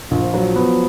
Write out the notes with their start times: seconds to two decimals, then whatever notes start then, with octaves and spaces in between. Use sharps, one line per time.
0.11 A#1 F3
0.34 F#3
0.55 B3